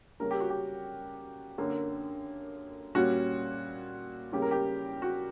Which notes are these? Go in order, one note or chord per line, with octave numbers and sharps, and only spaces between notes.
C#3 G3 A#3 C#4 A#4
G4
F#4
G4
F#2 D3 A#3
A#2 G3 C#4 F#4
E2 C#3 G3 A#3 G4
A#4
G4
F#4